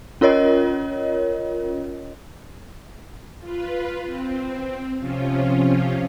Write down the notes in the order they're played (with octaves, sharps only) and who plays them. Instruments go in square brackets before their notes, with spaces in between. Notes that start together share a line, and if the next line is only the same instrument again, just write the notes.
[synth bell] C#4 F4 A#4 C#5 D#5
[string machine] F4 B4
C4
C3 F3 C#4 F4